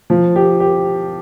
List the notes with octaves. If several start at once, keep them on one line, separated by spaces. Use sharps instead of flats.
F3
G4
G4